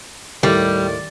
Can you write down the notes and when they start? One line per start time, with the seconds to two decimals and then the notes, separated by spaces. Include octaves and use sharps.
0.43 D#2 A2 G3